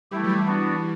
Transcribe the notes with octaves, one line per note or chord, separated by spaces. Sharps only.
E3 G3 A3 E4 G4
F#3
E3 G3
B3 D4 F#4